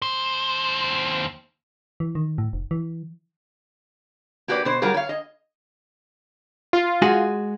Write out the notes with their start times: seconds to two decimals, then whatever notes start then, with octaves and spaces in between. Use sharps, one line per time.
0.02 D#2 C5
2.00 E3
2.15 D#3
2.38 A2
2.53 F1
2.71 E3
4.48 A#3 F#4 G4 B4 D5
4.65 B2 C5
4.82 F#3 G3 F4 G#4 A#4
4.94 C#5 F5
5.09 D#5
6.73 F4
7.02 G#3 F#4 G#4